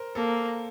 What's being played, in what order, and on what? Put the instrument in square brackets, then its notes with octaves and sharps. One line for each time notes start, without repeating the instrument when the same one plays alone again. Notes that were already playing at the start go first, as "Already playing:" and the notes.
Already playing: [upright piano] A#4 C5
[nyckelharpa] A#3 [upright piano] A4